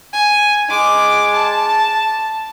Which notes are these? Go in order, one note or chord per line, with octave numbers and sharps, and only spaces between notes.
G#5
G#3 D6
A5